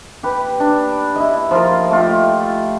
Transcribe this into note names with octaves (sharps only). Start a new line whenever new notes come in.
G4 B4
D4
E4 D#5
F3 F4 A#4
A3 F4 G4